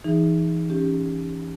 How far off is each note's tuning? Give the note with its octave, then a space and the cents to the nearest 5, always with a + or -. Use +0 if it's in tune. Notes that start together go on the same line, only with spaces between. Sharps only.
E3 +15 D#4 +0 G#4 -10
C#4 +0 G4 +20